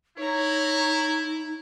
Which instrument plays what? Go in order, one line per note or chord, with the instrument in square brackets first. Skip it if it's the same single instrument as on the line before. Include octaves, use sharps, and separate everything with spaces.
[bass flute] D#4 [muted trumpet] E4 [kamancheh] C#5 A#5